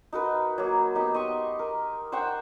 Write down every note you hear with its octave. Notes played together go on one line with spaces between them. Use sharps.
D#4 F#4 A#4 B4
F#3 A#3
B3 D#4 G4
D#5 C6 C#6
A#4
C5 F#5 G5 C#6